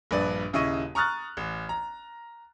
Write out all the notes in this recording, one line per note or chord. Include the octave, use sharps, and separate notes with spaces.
A#1 G2 B4 D5
D#1 C#3 E4 D#5 C#6 D#7
A#5 C#6 D#6 F6 F#6 A6
A1
A#5